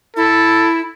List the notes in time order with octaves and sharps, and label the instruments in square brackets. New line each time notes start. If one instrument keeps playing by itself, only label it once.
[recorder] E4 [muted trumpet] A4